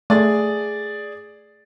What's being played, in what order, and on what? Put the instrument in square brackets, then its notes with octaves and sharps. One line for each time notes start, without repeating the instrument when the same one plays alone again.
[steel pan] A3 [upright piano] G#4 D5